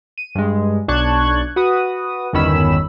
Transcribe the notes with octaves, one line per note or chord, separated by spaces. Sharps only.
D#7
G2 G#3
B1 D4 A5 C#6 F#6 G#6
F#4 B4 D#6
G1 E2 D#3 C#4 B5 E6